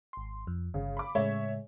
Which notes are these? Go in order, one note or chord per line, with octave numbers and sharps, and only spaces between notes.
G#1 C6
F2
G1 C#3
B5 D6
A2 C#3 G#3 C#5 E5